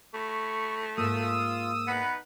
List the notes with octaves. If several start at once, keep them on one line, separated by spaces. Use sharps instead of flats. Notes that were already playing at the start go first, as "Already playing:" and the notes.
A3 B5 C#6
G#2 A#3 F4 D#6 E6
B3 D#4 B4 F#5